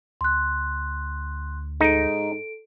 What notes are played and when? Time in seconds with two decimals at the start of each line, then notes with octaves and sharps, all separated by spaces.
0.21 D2 C6 F#6
1.81 G#2 D#4 A4 D7